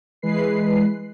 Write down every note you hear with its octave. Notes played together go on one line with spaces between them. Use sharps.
E3 G#3 B4 C7